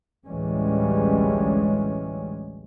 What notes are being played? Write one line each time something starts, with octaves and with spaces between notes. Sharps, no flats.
A1 D2 E3 G3 G#3 C#4